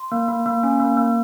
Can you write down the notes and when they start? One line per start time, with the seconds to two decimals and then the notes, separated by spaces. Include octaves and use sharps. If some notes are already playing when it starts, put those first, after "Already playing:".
Already playing: C6
0.12 A#3
0.28 A#3
0.46 A#3
0.63 C#4
0.80 A#3
0.97 A#3